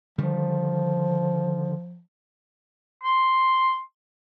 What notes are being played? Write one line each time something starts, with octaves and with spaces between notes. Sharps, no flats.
D3 D#3 F3 G3
C6